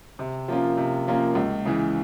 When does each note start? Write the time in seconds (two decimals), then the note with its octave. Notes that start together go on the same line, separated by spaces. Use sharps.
0.19 C3
0.48 F3 A#3 C#4 F4
0.77 C3
1.07 F3 A#3 C#4 F4
1.35 C#2
1.66 C#3 E3